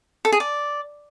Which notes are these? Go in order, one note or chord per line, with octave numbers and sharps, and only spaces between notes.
A4
G#4
D5